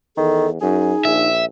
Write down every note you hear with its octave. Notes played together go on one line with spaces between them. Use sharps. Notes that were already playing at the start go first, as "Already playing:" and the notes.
E2 D#3 A4
F#2 D#4 G#4
A#1 E5